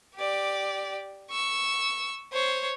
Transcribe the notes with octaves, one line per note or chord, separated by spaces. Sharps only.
G4 D5
C#6 E6
C5 C#5